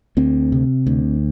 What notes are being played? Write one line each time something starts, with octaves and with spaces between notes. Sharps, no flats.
D2 C4
C3
D2